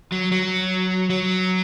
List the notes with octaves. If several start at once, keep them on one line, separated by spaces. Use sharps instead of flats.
F#3
F#3
F#3